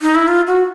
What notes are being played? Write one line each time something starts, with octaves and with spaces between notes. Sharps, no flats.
D#4
E4
F4
F#4